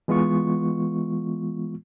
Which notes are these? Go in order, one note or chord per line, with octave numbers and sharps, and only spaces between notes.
E3 G#3 B3 F4 C#6